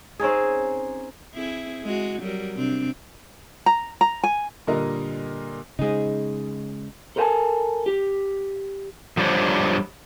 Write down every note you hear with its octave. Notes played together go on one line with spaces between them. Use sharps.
C4 C#4 D#4 G#4
C4 E4 G#4
G#3 F#4
F#3 G3 A#4
C3 C4 D4
A#5
A#5
G#5
A#2 D3 G3 A#3 A#4 D#5
C#3 G#3 D#4 G#4
A4 A#4 C5 F5 G#5 A5
G4
F3 G3 D4 A4 C5 C#5